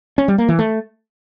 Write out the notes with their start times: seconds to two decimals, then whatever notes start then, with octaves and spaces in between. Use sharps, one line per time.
0.18 C#4
0.28 G3
0.38 A#3
0.49 E3
0.59 A3